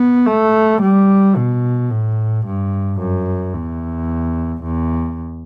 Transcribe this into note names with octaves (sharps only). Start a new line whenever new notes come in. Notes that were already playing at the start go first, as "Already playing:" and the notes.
Already playing: B3
A3
G3
B2
A2
G2
F#2
E2
E2